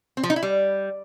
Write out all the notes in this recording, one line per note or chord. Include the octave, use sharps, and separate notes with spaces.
C4
F3
D#4
E4
G3